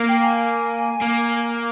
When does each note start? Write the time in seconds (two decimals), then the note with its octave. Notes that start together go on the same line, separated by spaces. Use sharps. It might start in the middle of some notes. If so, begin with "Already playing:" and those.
Already playing: A#3
0.09 G5
0.24 G#5
1.01 A#3